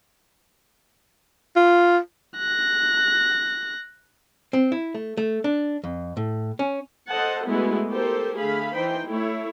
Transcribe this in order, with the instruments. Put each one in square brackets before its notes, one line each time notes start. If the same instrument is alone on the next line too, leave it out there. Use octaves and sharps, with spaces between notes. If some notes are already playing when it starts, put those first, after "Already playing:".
[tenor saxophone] F4
[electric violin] F#6 A#6
[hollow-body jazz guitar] C4
E4
A3
A3
D4
F2
A2
C#4
[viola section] A4 C5 D#5 F#5 A5
G#3 A3 B3 E4 F#4
G4 A4 A#4 C5
D3 A3 G#4 F5 B5
E3 D#4 C5 G5
A3 E4 C#5